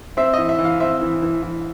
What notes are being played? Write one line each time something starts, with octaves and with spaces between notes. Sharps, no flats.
C4 E5
E3 D#5
E5
E3
F5
C4 E5
E3
E3
E3